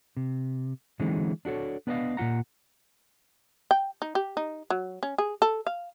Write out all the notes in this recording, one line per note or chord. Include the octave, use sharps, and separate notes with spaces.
C3
D3 E3 F#3 G#3 C4 D#4
D4 F#4 A4 C#5
B3 D4 B4 C5 D#5 F5
A#2 D#3 F4 F#5 A#5
G5
D#4
G4
D#4
F#3
C#4
G#4
A4
F5